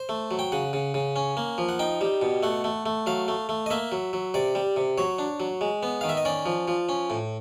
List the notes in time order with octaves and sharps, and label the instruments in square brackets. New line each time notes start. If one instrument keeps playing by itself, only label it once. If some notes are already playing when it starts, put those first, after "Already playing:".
Already playing: [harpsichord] C5
A3
F#3
G5
C#3 F#5
C#3
C#3
C#4
A#3
F3
F#5
D#4 G5
G3
B2
A3 F#5
A3
A3
F#3 F5
A3
A3
D#5
A#3 E5
F#3
F#3
C3 D5
G3
C3
F#3 C#5
D4
F#3
G#3
B3
D#3 F5
E5
D#5
C#4 D5
F3
F3
C#4
A2